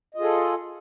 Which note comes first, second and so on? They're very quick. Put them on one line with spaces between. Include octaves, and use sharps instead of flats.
D#5 F4 G#4 A4